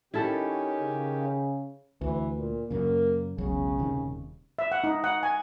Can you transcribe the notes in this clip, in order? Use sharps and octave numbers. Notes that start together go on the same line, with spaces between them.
D#3 C#4 E4 G4 A4
C#3
D2 E3
A#2
F#2 C#3 A#3
E1 B1 C#3 F#3
D#1 C3 D#3
E5
F#5
D#4
F#5
G#5